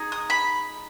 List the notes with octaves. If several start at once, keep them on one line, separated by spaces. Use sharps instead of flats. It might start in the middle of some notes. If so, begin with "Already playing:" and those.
Already playing: D#4 G#4
D#6
B5